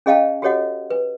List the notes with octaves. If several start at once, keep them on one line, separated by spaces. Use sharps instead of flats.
C#4 G#4 D#5 F5 G5 A5
F#4 G4 A4 C#5 D#5 F#5
B4